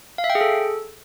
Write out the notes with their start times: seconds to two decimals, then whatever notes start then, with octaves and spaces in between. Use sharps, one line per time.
0.18 F5
0.24 E5
0.30 G5
0.35 G#4
0.41 A4